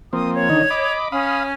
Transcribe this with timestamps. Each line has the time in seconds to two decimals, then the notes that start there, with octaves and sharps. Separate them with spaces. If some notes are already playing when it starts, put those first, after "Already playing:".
0.13 F3 A#3 C4 D#6
0.34 C#5
0.49 D3 D#3 D#4
0.70 D#5 B5 D6
1.12 C#4 F5 B5 D#6